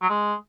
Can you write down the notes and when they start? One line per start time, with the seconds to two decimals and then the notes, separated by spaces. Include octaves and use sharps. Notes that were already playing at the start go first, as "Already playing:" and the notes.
0.02 F#3
0.10 G#3